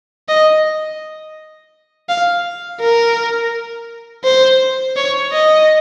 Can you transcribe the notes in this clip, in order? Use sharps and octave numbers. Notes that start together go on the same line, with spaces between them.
D#5
F5
A#4
C5
C#5
D#5